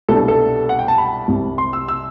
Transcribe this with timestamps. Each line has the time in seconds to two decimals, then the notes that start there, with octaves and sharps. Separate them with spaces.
0.08 C2 B2 G3 D4 A4
0.28 A4
0.69 F#5
0.79 G5
0.88 A5
0.98 B5
1.28 C2 C3 G3
1.58 C6
1.73 E6
1.88 E6